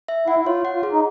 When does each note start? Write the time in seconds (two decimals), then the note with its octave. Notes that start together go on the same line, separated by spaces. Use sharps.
0.08 E5
0.28 E4 F#5
0.39 E4
0.46 F4 C#5
0.65 F#5
0.73 F4
0.83 G#4
0.92 D#4